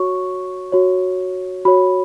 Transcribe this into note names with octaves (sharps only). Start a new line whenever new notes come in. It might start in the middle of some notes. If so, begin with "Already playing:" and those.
Already playing: F#4 C#5 C#6
F#4 C#5
F#4 C#5 B5